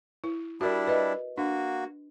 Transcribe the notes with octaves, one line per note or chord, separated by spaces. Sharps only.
E4
G3 D4 E4 F#4 A#4 D5
B4 D#5
A#3 D4 F#4